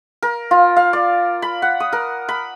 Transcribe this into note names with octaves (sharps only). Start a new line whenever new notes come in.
A#4
F4
F5
D5
B5
F#5
D#6
A#4
B5